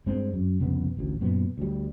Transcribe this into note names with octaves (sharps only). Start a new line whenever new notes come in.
G2 G#3 C4 D4
F#2
C2 F2 C#3 B3
A1 D2
F#2 A#2 B3
D2 G3